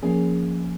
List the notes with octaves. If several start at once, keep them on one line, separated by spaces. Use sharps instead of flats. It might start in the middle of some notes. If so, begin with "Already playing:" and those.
F3 A#3 C#4 G#4